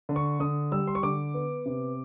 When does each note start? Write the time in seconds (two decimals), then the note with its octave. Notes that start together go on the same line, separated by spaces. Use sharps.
0.09 D3
0.16 C#6
0.40 D3 D#6
0.72 G3 E6
0.87 C6
0.95 C#6
1.03 D3 D6
1.34 B3
1.66 C3